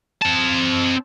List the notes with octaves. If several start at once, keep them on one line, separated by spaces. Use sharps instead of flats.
C4 A5